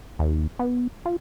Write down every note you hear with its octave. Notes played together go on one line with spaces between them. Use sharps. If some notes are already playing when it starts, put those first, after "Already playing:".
D#2
B3
F4